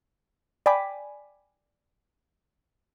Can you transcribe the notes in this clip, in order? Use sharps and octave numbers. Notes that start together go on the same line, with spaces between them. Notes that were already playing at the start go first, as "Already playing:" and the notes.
D5 G5 G#5 B5 D6 B6